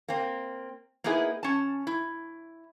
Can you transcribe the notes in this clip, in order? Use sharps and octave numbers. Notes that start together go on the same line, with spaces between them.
A#3 C4
A#3 B3 D#4 E4 G#4
C#4 A5
E4